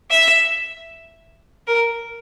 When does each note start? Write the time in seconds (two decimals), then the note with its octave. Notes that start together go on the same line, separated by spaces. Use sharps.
0.11 E5
1.67 A#4